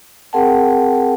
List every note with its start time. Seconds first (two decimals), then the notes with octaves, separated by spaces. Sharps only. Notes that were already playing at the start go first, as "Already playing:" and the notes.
0.33 C4 G#4 A#4 F#5 G5 A5